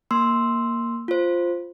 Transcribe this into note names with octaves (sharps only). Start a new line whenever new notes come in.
A#3 C6 E6
F4 C5